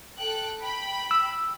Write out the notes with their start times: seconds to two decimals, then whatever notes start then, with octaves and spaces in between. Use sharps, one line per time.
0.18 A4 G5 F#6
0.61 G5 B5
1.11 E6